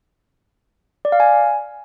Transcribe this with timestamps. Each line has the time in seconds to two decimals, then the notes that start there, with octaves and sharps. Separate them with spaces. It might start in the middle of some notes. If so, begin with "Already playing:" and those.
1.05 D5
1.12 F5
1.20 G#5